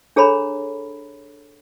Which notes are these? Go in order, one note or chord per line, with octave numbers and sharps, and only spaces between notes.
D4 G#4 A4 C#5 A#5 B5